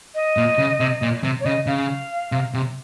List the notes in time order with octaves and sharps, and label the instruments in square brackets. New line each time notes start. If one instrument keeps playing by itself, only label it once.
[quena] D#5
[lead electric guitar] A#2
C#3
C3
A#2
C3
[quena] C#5
[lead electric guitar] C#3 [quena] D#5
[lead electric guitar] C#3 [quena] F5
[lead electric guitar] C3
C3